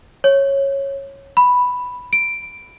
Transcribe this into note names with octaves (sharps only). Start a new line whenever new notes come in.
C#5
B5
D7